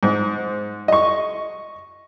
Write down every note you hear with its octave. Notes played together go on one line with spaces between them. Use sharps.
G#2
D#5 C#6